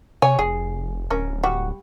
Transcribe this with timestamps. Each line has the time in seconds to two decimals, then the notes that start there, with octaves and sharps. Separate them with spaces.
0.22 C3 C#5 G#5
0.39 F1 G#4
1.10 D1 C#4 A#4
1.44 G3 F#4